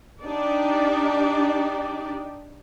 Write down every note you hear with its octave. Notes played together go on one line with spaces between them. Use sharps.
D4 D#4 G4 D5